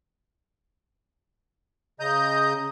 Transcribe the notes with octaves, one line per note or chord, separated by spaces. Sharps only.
C#3 D#5 A#5 D#6 G6